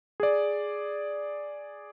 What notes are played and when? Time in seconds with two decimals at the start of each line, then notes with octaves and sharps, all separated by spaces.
0.20 G#4 D5